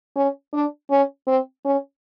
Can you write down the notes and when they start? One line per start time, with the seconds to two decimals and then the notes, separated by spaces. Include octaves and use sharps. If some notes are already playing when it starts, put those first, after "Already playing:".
0.16 C#4
0.53 D4
0.90 C#4
1.27 C4
1.65 C#4